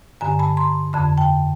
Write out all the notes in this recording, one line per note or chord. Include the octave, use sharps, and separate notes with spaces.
G2 D3 G#5 A#5
A5 B5
A#5 C6
F2 D3 A5 B5
G5 A5